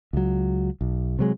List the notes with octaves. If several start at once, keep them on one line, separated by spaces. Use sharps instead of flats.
C#2 F#3
B1
C3 F#3 G#3